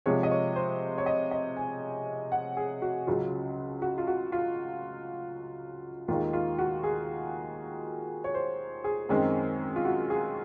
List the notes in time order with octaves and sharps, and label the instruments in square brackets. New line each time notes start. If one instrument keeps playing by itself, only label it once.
[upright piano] C3 F3 G#3 C#5
D#5
C#5
C5
C#5
D#5
D#5
G#5
F#5
G#4
F#4
C#2 C#3 F#3 F4
F#4
F4
F#4
F4
D#2 D#3 G#3 F4
F4
F#4
G#4
C#5
C5
G#4
F#2 D#3 G#3 C4
F4
F#4
G#4